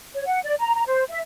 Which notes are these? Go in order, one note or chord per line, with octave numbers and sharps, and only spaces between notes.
C#5
F#5
D5
A#5
A#5
C5
E5